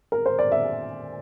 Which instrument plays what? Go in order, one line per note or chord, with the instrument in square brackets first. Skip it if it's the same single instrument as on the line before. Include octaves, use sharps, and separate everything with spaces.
[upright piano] A#4
C5
D5
E5